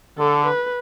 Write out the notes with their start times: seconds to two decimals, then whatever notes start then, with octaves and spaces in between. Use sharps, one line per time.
0.18 D3 A4
0.47 B4